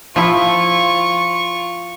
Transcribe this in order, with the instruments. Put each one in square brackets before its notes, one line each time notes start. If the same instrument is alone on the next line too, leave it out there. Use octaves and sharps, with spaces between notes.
[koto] F3 E4 [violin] F4 C#6